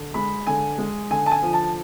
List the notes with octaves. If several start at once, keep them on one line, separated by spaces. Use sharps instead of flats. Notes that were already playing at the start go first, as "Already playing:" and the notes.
Already playing: D3
G#3 B5
D3 G#5
G#3
D3 G#5
A5
G#5
F3
A5